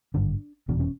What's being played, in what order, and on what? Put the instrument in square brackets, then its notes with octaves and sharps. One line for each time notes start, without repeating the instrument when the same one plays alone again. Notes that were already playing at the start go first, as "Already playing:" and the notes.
[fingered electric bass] G#1 G2 D3 D4
F1 E2 B2 D4
C#4